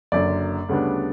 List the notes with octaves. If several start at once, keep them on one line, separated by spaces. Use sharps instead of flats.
F#1 F#2 D3 D5
D2 C#3 G3 B3 D4